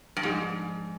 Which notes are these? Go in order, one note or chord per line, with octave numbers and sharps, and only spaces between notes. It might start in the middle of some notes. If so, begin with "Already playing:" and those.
G2
G#2 F3 G#3 D4